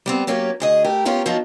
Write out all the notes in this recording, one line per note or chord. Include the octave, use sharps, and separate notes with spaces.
G3 B3 C4
F#3 A#3 C#4 G4
D2 G#4 D#5
A3 G4 A#4
B3 C#4 F4 G4 A#4
F3 F#3 B3 D#4 F4